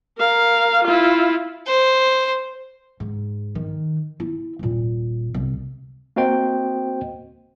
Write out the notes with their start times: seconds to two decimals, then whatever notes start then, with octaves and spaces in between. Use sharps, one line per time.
0.18 A#4 F5
0.84 E4 F4
1.66 C5
3.00 G#2
3.55 D#3
4.20 E4
4.59 D#1 A#2
5.34 C2
6.16 A#3 C4 F#4 C5 D#5 G5